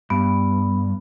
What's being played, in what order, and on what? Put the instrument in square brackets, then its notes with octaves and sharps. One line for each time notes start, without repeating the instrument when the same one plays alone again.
[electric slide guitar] G2 [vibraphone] B3